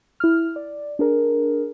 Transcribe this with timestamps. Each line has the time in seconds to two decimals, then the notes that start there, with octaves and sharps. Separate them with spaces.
0.20 E4 F6
0.56 D5
0.99 D4 G#4 A#4